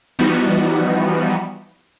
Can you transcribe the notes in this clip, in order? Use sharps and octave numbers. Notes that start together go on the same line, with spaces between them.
E3 F3 G3 B3 D#4 F#4